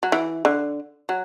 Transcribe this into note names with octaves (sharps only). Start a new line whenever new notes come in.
F#3
E3
D3
F#3